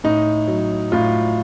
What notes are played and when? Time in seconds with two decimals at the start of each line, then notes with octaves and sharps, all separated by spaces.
0.04 A2 D#4
0.48 F#3
0.92 A2 F4